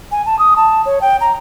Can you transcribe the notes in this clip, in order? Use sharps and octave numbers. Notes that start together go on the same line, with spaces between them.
G#5
A5
D#6
A5
C#5
G5
A#5